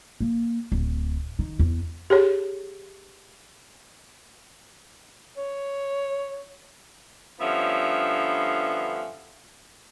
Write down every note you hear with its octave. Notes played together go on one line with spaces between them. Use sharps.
A#3
D1
D#3
E2
G4 G#4 C#5
C#5
G2 D3 F3 B3 C#4 E5